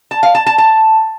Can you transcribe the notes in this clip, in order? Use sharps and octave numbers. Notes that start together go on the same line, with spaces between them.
A5
F5
A5
A5
A5